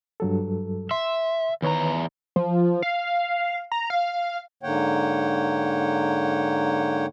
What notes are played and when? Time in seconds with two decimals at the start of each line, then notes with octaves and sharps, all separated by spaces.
0.20 G2 F#3 A4
0.91 E5 C6
1.62 E2 D#3 B4 C#5 A#5
2.36 F3
2.83 F5
3.72 A#5
3.90 F5
4.63 G#2 D3 A#3 C#5 F#5 G5